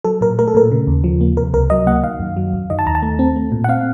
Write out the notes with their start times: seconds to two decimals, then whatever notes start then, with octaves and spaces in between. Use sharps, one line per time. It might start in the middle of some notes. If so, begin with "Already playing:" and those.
0.04 F#3 A4
0.21 A#2 A#4
0.39 A3 A#4
0.48 A4
0.54 A#2 A#4
0.72 C#3
0.87 D#2
1.04 F3
1.21 A#3
1.37 C3 A#4
1.54 C#2 A#4
1.70 F#3 D#5
1.87 A#3 F#5
2.03 D#3 F5
2.20 F#2
2.36 F#3
2.54 F#2
2.70 D#3 D#5
2.79 A5
2.86 D#2 A#5
2.95 A5
3.02 A3
3.19 C4
3.36 A3
3.52 A#2
3.64 F#5
3.68 C4 F5